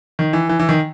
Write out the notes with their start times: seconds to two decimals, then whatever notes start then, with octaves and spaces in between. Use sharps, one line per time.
0.19 D#3
0.33 E3
0.49 E3
0.60 E3
0.69 D#3